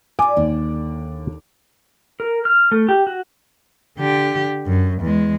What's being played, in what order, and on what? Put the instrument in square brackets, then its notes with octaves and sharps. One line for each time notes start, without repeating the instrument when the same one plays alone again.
[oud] G#2 G3 [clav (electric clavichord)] G#5 [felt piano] D6
[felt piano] D#2 [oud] D3
[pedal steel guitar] A#4
F6
A3
G4
F#4
[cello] D3 G4
F#2
E2 G#3